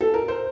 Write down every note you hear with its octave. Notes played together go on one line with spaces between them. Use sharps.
A4
A#4
C5